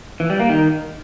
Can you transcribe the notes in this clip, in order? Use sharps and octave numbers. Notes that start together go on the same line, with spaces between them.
E3
G3
A#3
D#3